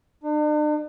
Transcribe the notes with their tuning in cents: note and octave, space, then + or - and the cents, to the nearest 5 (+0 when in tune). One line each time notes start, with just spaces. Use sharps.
D4 +45